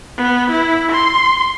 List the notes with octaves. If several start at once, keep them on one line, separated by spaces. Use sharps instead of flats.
B3
E4
C6